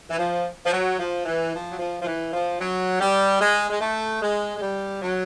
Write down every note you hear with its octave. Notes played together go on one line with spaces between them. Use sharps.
E3
F3
F3
F#3
F3
E3
F3
F#3
F3
F3
E3
F3
F#3
G3
G#3
G#3
A3
G#3
G#3
G3
F#3